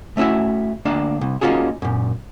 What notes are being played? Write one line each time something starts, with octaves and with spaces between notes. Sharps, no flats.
A3 C#4 E4 F#4 E5
D2 A#3 D4 F5
C2
A#3 C#4 D#4 F4 F#4 G#4
F#2 A#2